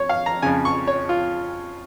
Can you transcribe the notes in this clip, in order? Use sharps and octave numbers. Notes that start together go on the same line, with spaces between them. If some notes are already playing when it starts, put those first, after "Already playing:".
Already playing: C#5
F5
A#5
F2 C#3 G#5
C#6
C#5
F4